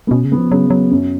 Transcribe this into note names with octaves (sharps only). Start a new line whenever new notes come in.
B3
B2 C#4
C#3
B3
F3
C#3 F#3
F#3
F#2